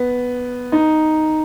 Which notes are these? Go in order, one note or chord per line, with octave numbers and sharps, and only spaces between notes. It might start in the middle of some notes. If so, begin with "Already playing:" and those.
Already playing: B3
D#4